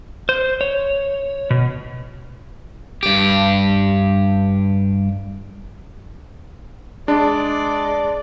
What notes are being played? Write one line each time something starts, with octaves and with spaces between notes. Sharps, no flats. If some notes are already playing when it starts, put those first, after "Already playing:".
C5
C#5
B2
G2 G4
G#3 D4 D5